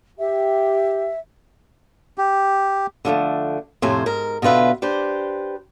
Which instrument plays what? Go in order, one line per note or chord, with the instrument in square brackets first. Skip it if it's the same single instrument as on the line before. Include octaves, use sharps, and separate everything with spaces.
[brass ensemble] G4 [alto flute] E5
[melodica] G4
[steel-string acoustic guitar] D3 F3 F#3 A3
F2 A2 C3 C5 C#5 G#5
G#2 A#4
B2 D3 F4 B4 E5
D4 G4 B4 C5